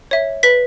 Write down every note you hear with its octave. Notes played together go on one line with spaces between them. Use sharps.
C#5 E5
B4 B6